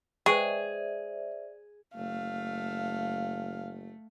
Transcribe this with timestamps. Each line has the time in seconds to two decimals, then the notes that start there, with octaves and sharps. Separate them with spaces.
0.26 G#3 G#4 B4 C5 D5 E5 G5 C#6
1.96 F#1 A3 F5